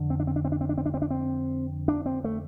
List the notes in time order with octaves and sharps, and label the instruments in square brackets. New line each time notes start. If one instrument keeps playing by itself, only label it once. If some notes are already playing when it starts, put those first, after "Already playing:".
Already playing: [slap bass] F2 D3
C4
D4
C4
D4
C4
D4
C4
D4
C4
D4
C4
D4
C4
D4
C4
A3